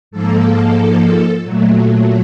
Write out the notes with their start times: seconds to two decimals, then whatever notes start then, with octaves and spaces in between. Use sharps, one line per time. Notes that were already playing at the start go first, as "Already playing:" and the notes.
0.11 G#2 F3 A#3 A4
1.44 A#2 F#3 A3